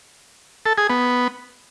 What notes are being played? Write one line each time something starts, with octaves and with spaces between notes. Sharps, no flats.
A4
G#4
B3